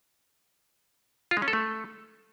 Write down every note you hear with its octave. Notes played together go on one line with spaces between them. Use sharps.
F4
G#3
C#4
A4
A3